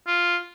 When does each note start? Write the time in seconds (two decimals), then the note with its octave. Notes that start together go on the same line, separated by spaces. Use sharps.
0.07 F4